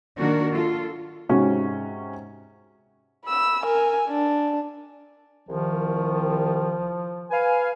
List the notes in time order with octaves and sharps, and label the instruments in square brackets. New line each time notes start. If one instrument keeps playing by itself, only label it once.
[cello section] D#3 A#3 D4 F#4 A#4
F4 A4
[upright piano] G#2 C3 C#4 F#4
[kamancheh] B5 E6
A#4 G#5
D4
[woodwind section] C2 D#3 [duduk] F3
[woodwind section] B4 F5 G#5